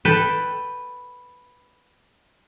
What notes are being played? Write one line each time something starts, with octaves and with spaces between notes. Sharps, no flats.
A4 B4 G5